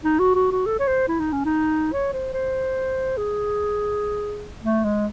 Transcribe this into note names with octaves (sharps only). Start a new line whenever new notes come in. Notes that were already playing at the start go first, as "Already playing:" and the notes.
D#4
F#4
F#4
F#4
A4
C#5
C5
E4
D#4
C#4
D#4
C#5
C5
C5
G#4
A3
G#3